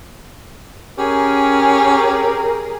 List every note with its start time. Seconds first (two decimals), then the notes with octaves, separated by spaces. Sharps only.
0.98 C#4 G4 G#4 A#4